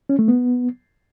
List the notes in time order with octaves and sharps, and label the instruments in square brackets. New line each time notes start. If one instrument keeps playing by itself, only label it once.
[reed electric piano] C#4
A3
B3